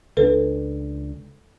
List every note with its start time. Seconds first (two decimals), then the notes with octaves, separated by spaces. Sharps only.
0.17 C#2 D4 A4 B4